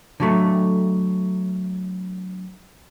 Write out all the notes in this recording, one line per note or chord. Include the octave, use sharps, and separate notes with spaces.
D3 F#3 A3